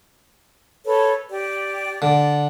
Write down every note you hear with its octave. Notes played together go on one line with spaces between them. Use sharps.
A4 B4 C#5
G4 D5
D3 D5